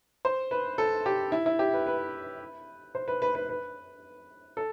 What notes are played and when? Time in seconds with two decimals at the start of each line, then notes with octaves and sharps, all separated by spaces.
0.25 C5
0.51 B4
0.78 A4
1.06 G4
1.32 E4
1.46 E4
1.59 G4
1.73 B4
1.87 B4
2.95 C5
3.08 B4
3.22 B4
3.35 B4
3.49 B4
4.57 A4